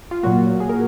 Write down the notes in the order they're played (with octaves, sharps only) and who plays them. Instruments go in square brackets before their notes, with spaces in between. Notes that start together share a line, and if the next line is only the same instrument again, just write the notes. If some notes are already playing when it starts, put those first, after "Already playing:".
[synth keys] F4
A#2 F#3 A#3 F#4
G#4
A#4